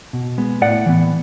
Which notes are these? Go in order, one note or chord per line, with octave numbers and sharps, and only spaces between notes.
B2
G#3 B3
A2 D5 F#5
E3 B3